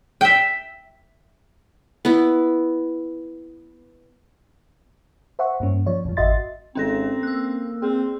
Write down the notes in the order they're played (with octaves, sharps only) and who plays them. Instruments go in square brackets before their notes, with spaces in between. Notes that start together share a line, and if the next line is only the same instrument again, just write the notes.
[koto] E5 G5
[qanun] B3 E4
[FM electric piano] C5 E5 F#5 C#6
G2 A#3 C#4
F3 C#5 D5
F2 A2 F3
G#1 F#4 D#5 E5 C6 A6
[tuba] G#1 [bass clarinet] C4 [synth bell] C#4 A4 A#6
[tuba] A#3 [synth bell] E6 F#6
[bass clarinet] C4 [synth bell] G#4